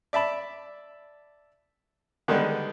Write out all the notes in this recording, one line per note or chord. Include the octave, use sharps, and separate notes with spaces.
D5 E5 A5 B5
D3 D#3 G3 G#3 B3 D#4